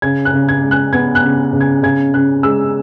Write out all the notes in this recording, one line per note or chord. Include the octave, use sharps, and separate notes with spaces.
C#3 G#6
F#6
C#3
G#6
G#3
F#6
B3 G#6
F#6
C#3
C#3
G#6
C#3 G#6
C#3 F#6
G#3 E6